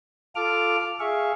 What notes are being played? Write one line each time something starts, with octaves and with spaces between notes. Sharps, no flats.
F4 A4 D6 F6
G#4 E5 F5 C#6